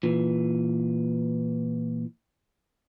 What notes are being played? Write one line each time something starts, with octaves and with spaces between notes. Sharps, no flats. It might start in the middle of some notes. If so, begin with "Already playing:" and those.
A#2 E3